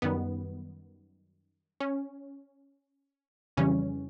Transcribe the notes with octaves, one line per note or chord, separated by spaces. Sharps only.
F#2 D#3 G3 B3
C#4
F2 C#3 E3 G3 C#4